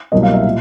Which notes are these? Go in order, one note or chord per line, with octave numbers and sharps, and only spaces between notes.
C2 B2 F#3 A#3 D#5
F5
E5
A#2